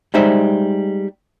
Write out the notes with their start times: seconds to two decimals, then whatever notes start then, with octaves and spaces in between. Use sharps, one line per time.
0.14 G3 G#3 D#4 C5 E5